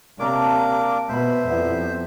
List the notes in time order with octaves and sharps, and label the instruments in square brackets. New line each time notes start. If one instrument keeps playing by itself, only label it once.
[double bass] C3 [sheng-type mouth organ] A#3 D4 D6 [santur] C#5 A5 A#5
[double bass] B2 [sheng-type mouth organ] C5 E5 [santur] F#5 B5
[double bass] F2 [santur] G3 B3 E4